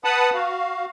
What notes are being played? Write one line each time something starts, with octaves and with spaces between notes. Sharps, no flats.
B4 F#5 A5 B5 D#6
F#4 F5